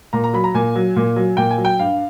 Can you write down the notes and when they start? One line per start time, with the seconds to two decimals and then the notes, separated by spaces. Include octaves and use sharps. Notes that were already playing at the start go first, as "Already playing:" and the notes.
0.13 A#2 A#5
0.24 A#5
0.33 F#3 B5
0.44 A#5
0.54 A#2 G#5
0.76 F#3
0.96 A#2
1.16 F#3
1.37 A#2 G5
1.51 G#5
1.58 F#3
1.65 G5
1.79 G2 F5